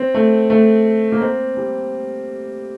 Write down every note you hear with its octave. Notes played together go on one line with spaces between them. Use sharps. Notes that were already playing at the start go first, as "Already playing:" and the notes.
Already playing: C4
A3
A3
A#3
C4
G3